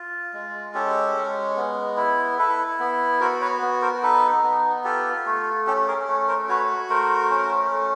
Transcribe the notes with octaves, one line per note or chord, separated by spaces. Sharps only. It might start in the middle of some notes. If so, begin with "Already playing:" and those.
Already playing: F4
G#3
C#4 G4 A4
G#3
B3
E4
E4 A4 B4
B3
F#4 A#4 C5
B4 C#5
B3
A#4 C5
D#4 A4 B4
B3
F4 G4 A4
A3
C#4 G4 A4
G#4 A#4
A3
A#4 C5
F#4 B4 C#5
A3 A#4 C5
C#4
A3